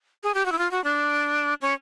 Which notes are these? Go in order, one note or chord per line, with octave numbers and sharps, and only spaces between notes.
G#4
G4
F#4
E4
F4
F#4
D4
C#4